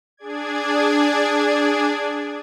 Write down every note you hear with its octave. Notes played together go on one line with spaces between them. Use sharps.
D4 G#4 D5 G#6